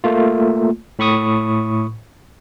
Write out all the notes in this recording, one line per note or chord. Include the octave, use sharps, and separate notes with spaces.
A3 A#3 F4
A2 B5 C#6 D#6